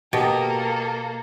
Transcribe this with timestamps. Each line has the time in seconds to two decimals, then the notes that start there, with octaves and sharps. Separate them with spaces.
0.13 B2 A#3 G4 A4 D#5